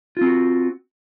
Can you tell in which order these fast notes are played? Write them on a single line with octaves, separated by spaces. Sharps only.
F4 C4 F#4